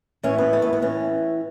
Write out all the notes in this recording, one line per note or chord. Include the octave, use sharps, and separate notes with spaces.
A2 E3 C#4
B3
A3
B3
B3
A2 E3 C#4